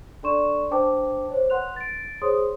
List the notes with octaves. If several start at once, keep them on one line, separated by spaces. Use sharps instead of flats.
D4 A4 D5 C6 C#6 E7
D4 B4 C5 G5 A5 D6
C5 C#5
B4 F#5 C6 F#6 F7
A6 D7
G#4 C5 C#5 C6 D#6